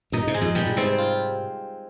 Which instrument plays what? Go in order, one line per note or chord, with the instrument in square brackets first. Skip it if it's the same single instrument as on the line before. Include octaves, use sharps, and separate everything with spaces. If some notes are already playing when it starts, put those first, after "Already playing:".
[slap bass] G2 A#2 [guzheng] D#4
[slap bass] G#2 C3
[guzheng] G#3
[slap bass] F2 G#2
[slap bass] G2 A#2 [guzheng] G3
[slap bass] A#2
[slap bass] G#2 C3 [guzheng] C4
[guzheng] F4